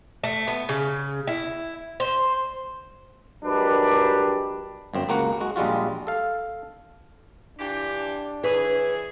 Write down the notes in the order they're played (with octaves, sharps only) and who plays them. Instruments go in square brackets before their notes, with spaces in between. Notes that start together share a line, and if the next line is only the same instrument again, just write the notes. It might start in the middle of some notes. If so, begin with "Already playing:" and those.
[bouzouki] A3
B3
C#3
E4
C5
[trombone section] F#3 G#3 D4 G4 A#4 B4
[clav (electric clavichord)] G1 F#2 C4
C#2 A#3 F#4 F#5
G#3 F#4
A#1 G3 G#3 F4 F#4
A4 F5
[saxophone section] E3 F4 G4 [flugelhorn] D4
[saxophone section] E3 G#4 [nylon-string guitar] B4 C#5